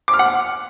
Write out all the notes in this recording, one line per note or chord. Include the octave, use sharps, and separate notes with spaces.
D6
F6
F#5